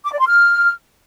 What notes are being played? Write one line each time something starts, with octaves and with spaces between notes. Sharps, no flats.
D6
D5
C6
F6